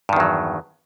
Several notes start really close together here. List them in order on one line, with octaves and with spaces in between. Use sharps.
G2 D#3 E2 F#3